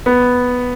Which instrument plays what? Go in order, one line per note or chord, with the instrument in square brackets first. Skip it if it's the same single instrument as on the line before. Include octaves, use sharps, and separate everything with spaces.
[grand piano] B3